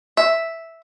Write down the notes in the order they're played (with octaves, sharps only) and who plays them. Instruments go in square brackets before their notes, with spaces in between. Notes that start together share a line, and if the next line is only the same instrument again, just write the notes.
[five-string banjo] E5